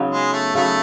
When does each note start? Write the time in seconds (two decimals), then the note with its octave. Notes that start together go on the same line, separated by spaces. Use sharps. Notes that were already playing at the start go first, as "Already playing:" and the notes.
Already playing: C#3 F#3 B3 D#4
0.11 G#3
0.33 A3
0.55 C#3 F#3 A3 B3 D#4